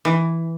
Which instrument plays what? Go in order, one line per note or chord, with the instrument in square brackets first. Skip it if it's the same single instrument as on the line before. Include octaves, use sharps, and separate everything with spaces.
[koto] E3